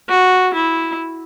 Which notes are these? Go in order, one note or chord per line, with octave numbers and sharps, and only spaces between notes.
F#4
E4